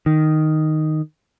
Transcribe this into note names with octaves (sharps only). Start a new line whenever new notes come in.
D#3